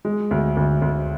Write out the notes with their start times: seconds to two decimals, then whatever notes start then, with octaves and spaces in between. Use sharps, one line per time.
0.05 G#3
0.31 D2
0.57 D2
0.82 D2